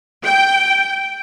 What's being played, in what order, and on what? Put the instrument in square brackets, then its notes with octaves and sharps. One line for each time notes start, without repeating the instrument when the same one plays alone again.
[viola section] G5